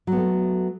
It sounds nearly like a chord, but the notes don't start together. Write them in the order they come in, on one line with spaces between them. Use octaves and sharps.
F#3 B3 A3